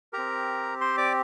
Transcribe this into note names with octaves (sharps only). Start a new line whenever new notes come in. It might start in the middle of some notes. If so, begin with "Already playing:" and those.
C4 G4 A#4 A#5
C5 C6
D5 D6